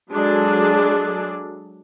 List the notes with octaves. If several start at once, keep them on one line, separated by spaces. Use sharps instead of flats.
F#3 G#3 D4 G#4 A4 D5